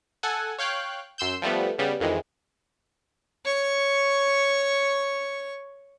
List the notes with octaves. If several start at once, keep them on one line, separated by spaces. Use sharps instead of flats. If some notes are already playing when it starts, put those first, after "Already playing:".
A4 F#5 G#5
C#5 F5 G5 F#6
F#2 C6 E6 G6
F3 G3 A3 B3
C#3 G3 B3
F2 D#3 E3 G#3
C#5 C#6